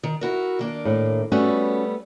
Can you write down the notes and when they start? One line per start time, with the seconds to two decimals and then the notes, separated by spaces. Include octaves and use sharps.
0.03 D#3
0.21 E4 F#4 A#4
0.59 D#3 A#3 D4
0.85 A2
1.32 G3 A3 B3 C#4 F#4